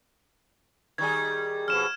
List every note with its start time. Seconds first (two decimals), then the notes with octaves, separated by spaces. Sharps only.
0.98 D#3 G3 G#4 G#6
1.68 F2 B2 F6 E7